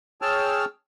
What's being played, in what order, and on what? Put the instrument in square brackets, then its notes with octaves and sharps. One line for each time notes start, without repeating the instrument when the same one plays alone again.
[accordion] G#4 C#5 G5 A5 E6 F6